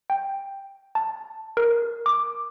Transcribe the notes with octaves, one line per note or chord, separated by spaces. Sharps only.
G5
A5
A#4
D6